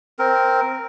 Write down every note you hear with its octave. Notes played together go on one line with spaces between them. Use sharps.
C4 A#4